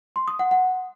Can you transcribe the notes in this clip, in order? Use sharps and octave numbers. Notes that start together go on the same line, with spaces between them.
C6
D#6
F#5
F#5